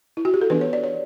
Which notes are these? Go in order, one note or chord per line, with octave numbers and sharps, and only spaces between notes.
E4
F#4
G4
A4
E3 B3 D4 B4
C#5
D5
C#5